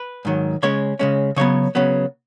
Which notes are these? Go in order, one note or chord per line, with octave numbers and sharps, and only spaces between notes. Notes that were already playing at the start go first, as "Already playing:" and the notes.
Already playing: B4
G#2 D#3 F#3
C#3 G#3 C#4 C#5
C#3 G#3 C#4
C#3 F#3 B3 C#5
C#3 F#3 B3